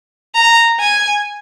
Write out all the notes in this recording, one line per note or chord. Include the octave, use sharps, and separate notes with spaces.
A#5
G#5